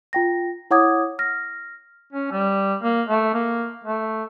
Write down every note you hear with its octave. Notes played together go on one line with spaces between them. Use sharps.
F4 G5 A#6
E4 C#5 F#5 D6 D#6 G#6
F6 A#6
C#4
G3
A#3
A3
A#3
A3